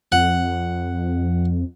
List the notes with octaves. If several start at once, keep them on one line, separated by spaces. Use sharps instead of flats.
F2 F#5